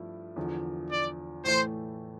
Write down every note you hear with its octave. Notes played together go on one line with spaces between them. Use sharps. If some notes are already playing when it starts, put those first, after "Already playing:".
Already playing: G2 F3 A3 E4
E2 D3 F3
D5
A2 E3 A3 C5